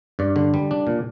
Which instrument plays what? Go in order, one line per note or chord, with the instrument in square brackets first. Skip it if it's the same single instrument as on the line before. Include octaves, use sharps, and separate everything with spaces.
[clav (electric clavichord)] G2 D5
D3
G3
D4
A#2